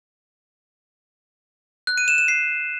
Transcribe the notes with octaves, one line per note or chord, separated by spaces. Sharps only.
F#6
D#7
E7
E7
C7